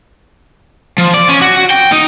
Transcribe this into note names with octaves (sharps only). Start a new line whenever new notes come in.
F3
D5
C#4
F#4
G5
D#4